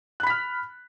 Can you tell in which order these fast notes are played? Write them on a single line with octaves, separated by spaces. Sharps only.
F#6 B5 B6 F6